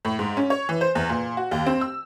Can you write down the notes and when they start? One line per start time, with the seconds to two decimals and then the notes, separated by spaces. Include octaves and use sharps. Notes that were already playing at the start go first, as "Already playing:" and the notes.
0.05 A2
0.19 G#2
0.37 C#4
0.50 C#5
0.69 E3
0.81 C5
0.95 E2
1.09 A#2
1.37 F#4
1.51 D#2
1.66 C4
1.81 E6